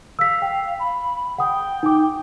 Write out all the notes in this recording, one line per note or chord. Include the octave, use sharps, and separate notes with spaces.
F5 E6 B6
G5
B5
F#5 G5 D#6
D#4 D6